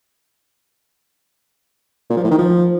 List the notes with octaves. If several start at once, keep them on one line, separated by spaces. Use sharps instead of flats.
A#2
F3
A2
D#3
F3